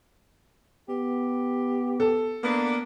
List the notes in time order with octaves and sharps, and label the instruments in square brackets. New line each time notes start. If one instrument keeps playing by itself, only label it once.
[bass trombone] B3 [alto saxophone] G4
[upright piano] A4
[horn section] A#3 B3 D4